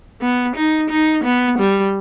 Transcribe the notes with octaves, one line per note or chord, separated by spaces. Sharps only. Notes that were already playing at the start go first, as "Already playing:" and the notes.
B3
D#4
D#4
B3
G3